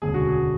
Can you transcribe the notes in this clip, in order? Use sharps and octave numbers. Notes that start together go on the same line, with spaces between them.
E1 D2 C#3 G#3 G#4
F#4
G#4